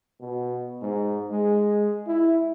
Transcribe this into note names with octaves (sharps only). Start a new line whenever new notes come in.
B2
G#2
G#3
E4